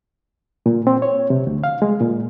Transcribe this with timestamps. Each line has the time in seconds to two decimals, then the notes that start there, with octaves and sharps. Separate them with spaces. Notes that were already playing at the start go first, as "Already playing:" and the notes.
0.66 A#2
0.87 C4
1.02 C#5
1.30 C3
1.47 D2
1.64 F5
1.82 G#3
2.00 A#2